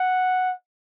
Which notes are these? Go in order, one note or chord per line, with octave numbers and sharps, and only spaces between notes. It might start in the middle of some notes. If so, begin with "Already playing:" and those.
Already playing: F#5